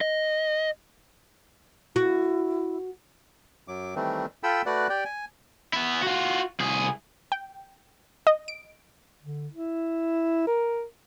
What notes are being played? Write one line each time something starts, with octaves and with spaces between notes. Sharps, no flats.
D#5
E4 F#4
F#2 F#3 D6
D#3 E3 G3 A3 C4
F4 A4 G5 B5 E6
A3 F#4 B4 D5 F#5
G4 D5 G5
G#5
B3 E4
F4 F#4
C2 G#4
G5
D#5
D7
D3
E4
A#4